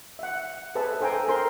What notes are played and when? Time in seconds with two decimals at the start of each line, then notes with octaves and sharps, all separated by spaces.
0.19 E5 F#5
0.75 G#4 A4 B4 C5 E5 A5
1.01 A4 C5 G5 G#5 A#5
1.28 G#4 A#4 C5 C6